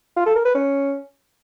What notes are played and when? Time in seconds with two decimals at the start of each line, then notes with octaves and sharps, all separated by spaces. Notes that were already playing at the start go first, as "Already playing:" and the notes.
0.16 F4
0.26 A4
0.36 A#4
0.45 B4
0.55 C#4